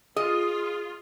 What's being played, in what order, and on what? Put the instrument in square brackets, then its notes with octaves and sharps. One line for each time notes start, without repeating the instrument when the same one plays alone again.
[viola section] F4 [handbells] G#4 [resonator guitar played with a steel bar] D#5